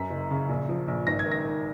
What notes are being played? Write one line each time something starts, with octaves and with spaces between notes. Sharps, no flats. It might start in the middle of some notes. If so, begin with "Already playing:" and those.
Already playing: F#2 B6
F#1
C#3
A#1
F3
A#1
G#1 A#6
G#6
D#3
A#6
D#3